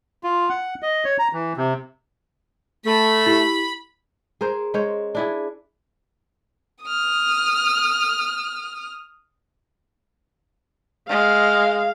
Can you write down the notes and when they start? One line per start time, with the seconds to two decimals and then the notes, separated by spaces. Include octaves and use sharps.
0.24 F4
0.49 F#5
0.83 D#5
1.05 C#5
1.19 A#5
1.33 E3
1.57 C3
2.86 A3 B5
3.26 E4 G4 F#7
4.41 G#4 A#4 C5
4.74 G#3 C#4 C5 C#5
5.15 D4 E4 G#4
6.84 D#6 F6
11.09 G#3 F5